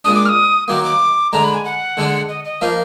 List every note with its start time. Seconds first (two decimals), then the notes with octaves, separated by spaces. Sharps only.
0.04 A#2 G#3 D4 D#6
0.15 D6
0.25 F6
0.29 D#6
0.68 D#3 F#3 A#3 D6
0.84 D6
1.32 D3 G#3 D4 A#5
1.44 B5
1.54 G#5
1.65 F#5
1.97 D3 G#3 D4
2.29 D#5
2.45 D#5
2.61 F3 A#3 D#4 F5